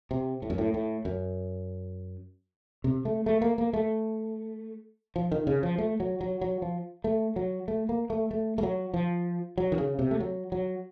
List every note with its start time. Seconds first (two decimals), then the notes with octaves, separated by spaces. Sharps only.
0.11 C3
0.42 A2
0.50 F#2
0.58 A2
0.74 A2
1.05 F#2
2.84 C3
3.05 A3
3.26 A3
3.42 A#3
3.58 A#3
3.73 A3
5.16 F3
5.32 D#3
5.47 C#3
5.63 F3
5.78 A3
6.00 F#3
6.21 F#3
6.42 F#3
6.62 F3
7.04 A3
7.36 F#3
7.68 A3
7.89 A#3
8.10 A3
8.31 A3
8.58 A3
8.63 F#3
8.94 F3
9.58 F#3
9.72 D#3
9.78 C#3
9.99 C3
10.11 A3
10.20 F#3
10.52 F#3